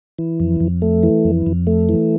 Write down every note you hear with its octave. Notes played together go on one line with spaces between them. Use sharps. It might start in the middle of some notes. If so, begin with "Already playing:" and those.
E3
F2
F2
A3
E3
F2
F2
A3
E3